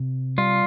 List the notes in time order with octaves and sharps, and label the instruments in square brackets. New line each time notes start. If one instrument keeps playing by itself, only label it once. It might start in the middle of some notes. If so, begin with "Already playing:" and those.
Already playing: [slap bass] C3
[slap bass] G3 [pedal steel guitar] F4